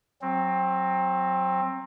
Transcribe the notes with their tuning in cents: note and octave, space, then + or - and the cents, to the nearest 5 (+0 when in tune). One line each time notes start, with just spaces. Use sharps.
F#3 +0 C4 +20